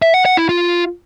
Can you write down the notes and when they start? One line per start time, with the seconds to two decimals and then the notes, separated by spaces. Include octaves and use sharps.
0.02 E5
0.14 F#5
0.26 F#5
0.37 E4
0.49 F4